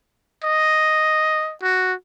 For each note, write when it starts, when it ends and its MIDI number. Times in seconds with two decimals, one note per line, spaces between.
0.44 1.53 75
1.62 1.94 66